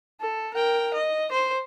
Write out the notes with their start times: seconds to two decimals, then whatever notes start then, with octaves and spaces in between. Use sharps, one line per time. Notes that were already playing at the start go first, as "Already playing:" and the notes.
0.21 A4
0.54 A#4 G5
0.94 D#5
1.31 C5